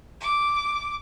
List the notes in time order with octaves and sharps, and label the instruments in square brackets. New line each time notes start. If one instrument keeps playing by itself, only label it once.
[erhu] D6